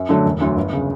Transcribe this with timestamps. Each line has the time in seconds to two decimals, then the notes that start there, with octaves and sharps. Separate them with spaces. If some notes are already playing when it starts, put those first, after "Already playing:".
Already playing: F#2
0.09 D3 F#3 A3 D4
0.26 E1
0.40 D2 D3 F#3
0.56 G1
0.73 C#3